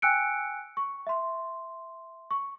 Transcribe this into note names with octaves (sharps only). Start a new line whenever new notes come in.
G5 G#5 E6 F#6 C#7 D7
C#6
E5 C6
C#6